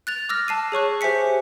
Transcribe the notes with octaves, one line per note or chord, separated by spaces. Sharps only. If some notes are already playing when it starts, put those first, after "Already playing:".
F#6 A6 F7
D6 E6 F6 A#6
A5 C7 D#7
G#4 C#5 C#6 F#6
G4 C5 E5 G#5 B6 C#7